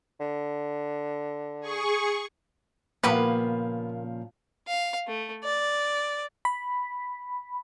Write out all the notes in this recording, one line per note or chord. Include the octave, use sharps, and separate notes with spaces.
D3
G#4 C#6
A#2 C#3 F3 A#3 B3 G4 B4
F5
A3
D5
B5